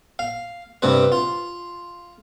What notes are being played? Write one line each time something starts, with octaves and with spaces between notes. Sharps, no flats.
F5
G2 C3 B4
F4